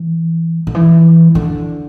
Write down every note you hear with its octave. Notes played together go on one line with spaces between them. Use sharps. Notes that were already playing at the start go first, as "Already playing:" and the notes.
Already playing: E3
D3
E3
D3